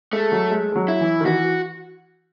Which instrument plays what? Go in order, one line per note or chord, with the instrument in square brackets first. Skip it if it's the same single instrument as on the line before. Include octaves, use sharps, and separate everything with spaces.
[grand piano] G#3 [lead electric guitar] A3
[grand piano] F#3
G#3
G#3
F#3
[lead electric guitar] E4
[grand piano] E3
D#3
[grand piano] E3 [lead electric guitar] F#4